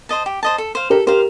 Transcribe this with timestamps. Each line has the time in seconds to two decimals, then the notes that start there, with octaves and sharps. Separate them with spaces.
0.09 C5 D#5 A5
0.26 G4
0.43 C5 D#5 A5
0.58 A4
0.75 C5 F5
0.90 G4 A4 A#4
1.07 G4 A#4 C5 F5